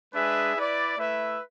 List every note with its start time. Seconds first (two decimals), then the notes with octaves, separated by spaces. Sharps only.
0.13 G#3 D4 G#4 B4 E5
0.56 E4 B4 D5
0.97 A3 E4 B4 E5